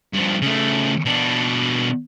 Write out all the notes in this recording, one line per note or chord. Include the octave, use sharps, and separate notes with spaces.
G2 F3
C#3 A3
B2 D4